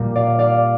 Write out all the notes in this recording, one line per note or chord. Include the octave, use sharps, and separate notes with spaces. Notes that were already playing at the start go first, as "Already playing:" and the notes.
Already playing: A#2 G3 A#3
D5 F5
D5 F5